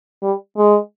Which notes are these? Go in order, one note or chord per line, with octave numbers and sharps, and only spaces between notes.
G3
G#3